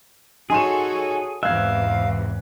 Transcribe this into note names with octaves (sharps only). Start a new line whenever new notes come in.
D#4 F#4 G#4 A4 C#5 G#5 C6 E7
E2 G#2 C3 E5 F5 F#6 G#6